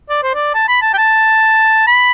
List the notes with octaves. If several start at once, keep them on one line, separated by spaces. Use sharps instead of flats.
D5
C5
D5
A5
B5
A5
G5
A5
B5